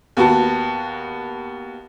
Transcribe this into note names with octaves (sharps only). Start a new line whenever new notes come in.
D#2 B3 F#4 A5